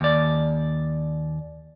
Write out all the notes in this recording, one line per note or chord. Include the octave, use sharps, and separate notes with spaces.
D#2 D5